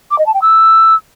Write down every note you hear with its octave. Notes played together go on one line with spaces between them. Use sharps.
D6
D#5
A5
G5
E6